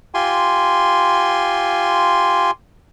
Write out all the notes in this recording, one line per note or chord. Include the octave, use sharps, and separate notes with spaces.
F4 G4 G#5 C6